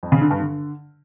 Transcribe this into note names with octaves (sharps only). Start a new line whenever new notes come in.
F2
C#3
D3
G2
D3